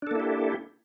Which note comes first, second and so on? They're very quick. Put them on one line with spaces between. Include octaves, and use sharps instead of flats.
D4 A4 A#3 E4 G4